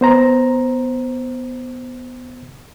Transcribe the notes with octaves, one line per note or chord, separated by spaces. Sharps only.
B3 C5 A#5